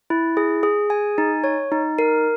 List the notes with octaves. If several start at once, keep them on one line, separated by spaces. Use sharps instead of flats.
E4
G#4
G#4
G#5
D#4
C#5
D#4
A#4